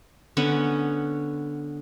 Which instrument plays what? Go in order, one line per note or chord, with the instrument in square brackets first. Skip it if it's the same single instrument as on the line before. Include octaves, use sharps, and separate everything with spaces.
[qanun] D3 B3 C#4